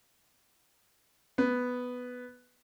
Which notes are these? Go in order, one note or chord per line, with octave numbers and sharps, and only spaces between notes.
B3